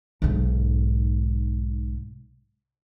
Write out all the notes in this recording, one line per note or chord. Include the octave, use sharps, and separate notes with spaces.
B1 G#2